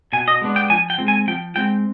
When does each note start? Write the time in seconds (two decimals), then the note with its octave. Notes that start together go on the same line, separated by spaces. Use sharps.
0.13 B2 G#5
0.28 D#5
0.42 G#3 B3 D4
0.56 G5
0.70 F3 G#5
0.90 G5
0.98 G#3 C4
1.08 G#5
1.28 F3 G5
1.56 G#3 C4 G5